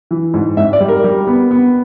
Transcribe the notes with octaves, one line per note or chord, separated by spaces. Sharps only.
E3
G#2
G#2 E5
D5
G3
A#4
G3
B3
B3